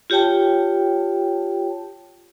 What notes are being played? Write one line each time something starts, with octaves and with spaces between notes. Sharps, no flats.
F4 G4 C#5 G5 A5